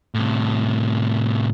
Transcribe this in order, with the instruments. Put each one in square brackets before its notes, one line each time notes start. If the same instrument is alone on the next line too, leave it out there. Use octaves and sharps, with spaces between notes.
[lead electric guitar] A2 C3